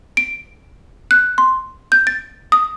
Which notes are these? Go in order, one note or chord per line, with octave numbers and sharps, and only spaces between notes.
D7
F#6
C6
G6
A6
D#6